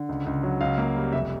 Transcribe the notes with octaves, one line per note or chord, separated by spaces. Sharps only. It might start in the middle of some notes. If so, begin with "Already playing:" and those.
Already playing: D3
C#2
C#2
F#3
C#2 F5
A#3
G3
F1 E5